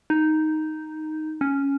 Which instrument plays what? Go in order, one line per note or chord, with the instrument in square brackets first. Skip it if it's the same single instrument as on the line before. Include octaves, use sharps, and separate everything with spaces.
[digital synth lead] D#4
C#4